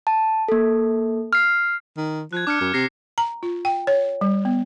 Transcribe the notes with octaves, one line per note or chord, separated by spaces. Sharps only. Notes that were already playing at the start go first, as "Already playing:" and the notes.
A5
A#3 A4
F6 C7
D#3
F3 F#6 G#6
D4 D6 F6 C#7
F#2
C3 A#6 C7
A#5
F4
G5
C#5
G3
B3